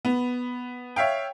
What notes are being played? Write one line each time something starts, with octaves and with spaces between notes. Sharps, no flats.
B3
C#5 E5 F5 G5